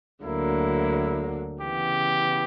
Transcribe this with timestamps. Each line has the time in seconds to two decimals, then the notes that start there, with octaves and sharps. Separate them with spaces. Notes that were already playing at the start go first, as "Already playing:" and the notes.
0.23 D2 D3 F#3 A#3 E4
1.61 C#3 E3 B3 G4